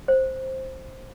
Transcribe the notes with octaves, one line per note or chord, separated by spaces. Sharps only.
C5